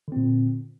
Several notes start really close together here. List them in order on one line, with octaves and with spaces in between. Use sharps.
D3 C4 A#2